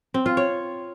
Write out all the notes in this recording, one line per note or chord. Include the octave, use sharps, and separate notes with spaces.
C4
F4
C#5